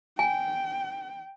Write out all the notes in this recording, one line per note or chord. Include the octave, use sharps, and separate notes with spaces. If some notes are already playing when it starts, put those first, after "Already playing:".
G5 G#5